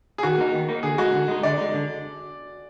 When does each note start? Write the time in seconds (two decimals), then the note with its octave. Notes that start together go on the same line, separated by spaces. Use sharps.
0.18 G#4
0.23 D#3 F#4
0.38 A#3 D#4
0.53 D#3
0.69 A#3 D#4
0.83 D3 G#4
0.98 G#3 D#4 F#4
1.13 D3
1.28 G#3 D#4
1.43 D3 D5
1.58 G#3 D#4
1.74 D3